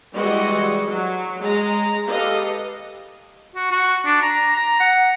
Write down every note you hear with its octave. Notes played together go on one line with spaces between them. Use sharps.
E3 G3 G#3 F#4 D#5
F#3
G#3 A#5
G4 A4 B4 D#5 F5
F#4
F#4
D4
A#5
A#5
F#5